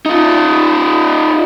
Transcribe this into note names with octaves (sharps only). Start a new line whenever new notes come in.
D#4 F4